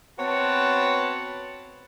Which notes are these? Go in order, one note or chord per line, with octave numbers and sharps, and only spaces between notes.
B3 C4 F#4 C#5 F#5 A5